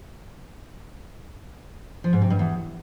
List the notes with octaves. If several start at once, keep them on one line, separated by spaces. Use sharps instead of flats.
F3
G#2
C3
G2
E2